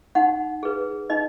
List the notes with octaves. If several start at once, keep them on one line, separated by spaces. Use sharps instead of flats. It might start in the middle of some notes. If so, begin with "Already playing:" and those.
D#4 F#5
G#4 B4
D#4 D#5